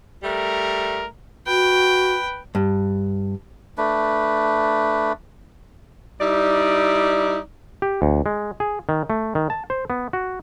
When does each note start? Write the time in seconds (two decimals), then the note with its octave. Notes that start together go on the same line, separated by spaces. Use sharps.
0.23 G3 A3 A#4
1.47 F#4 B4 G5
2.55 G2
3.78 A3 D4 B4
6.21 G3 D#4 E4 D5
7.82 G4
8.02 D2
8.26 G#3
8.60 G#4
8.89 D#3
9.10 A3
9.35 D#3
9.50 A5
9.70 C5
9.90 B3
10.13 F#4